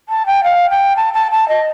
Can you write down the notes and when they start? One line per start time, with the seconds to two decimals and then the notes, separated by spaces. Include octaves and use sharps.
0.09 A5
0.26 G5
0.44 F5
0.70 G5
0.96 A5
1.13 A5
1.31 A5
1.48 D#5